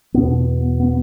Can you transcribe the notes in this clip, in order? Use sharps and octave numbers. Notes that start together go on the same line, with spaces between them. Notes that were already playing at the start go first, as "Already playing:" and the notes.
E2 B2 B3
B3